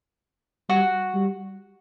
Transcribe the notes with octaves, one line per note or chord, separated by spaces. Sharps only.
G3 F#4
G3